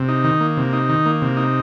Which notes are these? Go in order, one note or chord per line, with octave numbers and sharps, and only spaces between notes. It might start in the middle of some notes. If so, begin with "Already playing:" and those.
Already playing: C3
D#4
D#3
A#3
C3
D#4
D#3
A#3
C3
D#4